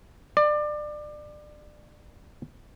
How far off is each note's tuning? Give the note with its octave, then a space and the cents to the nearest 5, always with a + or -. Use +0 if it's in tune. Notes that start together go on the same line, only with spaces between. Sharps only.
D5 +25